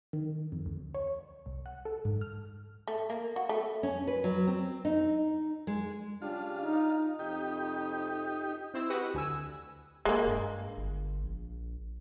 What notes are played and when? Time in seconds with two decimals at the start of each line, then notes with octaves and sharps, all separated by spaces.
0.13 D#3
0.52 F2
0.66 D2
0.94 C#5
1.46 C2
1.66 F#5
1.85 A4
2.05 G#2
2.21 F6
2.88 A3
3.10 A#3
3.36 F#4
3.49 A3
3.83 C#4
4.08 B4
4.24 F#3
4.47 C4
4.85 D#4
5.67 G#3
6.22 C#3 D4 F4 G4
6.63 D#4
7.19 F2 C3 D#4 G4
8.74 C4 E4 C5 E6
8.90 F#4 G4 B4 D#5 F#5
9.14 D2 G#5 E6
10.05 E1 G#3 A#3
10.27 G2
10.77 G1
11.23 A#1